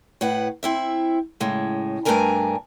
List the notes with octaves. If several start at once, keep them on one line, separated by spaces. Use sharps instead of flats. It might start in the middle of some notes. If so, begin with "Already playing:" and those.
A2 B4 F#5
C4 E4 E5
A2 C#3 G#3
G2 A3 D4 A#4 G#5 A#5